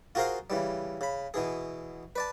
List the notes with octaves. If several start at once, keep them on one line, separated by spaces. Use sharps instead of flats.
F4 F#4 G#4 A#4 C5 F5
C#3 E3 G3
C#3 B5
B2 E3 G#4
B4 D5 A5